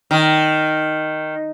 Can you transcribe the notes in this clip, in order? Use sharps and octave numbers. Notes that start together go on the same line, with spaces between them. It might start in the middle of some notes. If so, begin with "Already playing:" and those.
D#3